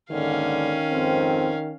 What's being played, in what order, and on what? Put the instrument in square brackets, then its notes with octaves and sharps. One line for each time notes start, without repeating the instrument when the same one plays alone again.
[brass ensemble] D#2 G#2 D3 [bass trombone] D#3 [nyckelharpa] C#4 F5
[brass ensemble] F2 G#2 C4